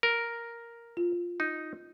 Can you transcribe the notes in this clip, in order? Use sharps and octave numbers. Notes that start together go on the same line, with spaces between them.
A#4
F4
D#4